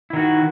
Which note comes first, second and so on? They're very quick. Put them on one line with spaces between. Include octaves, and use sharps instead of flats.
E4 D#3 F#4